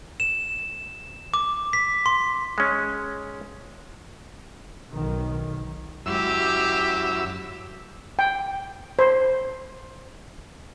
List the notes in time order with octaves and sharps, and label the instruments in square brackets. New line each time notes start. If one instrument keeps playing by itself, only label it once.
[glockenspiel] E7
D6
B6
C6
[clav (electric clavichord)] G#3 C#4
[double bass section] B1 D#3
[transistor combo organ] F#2 E4 E6 [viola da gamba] G#3 G4
[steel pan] G5
C5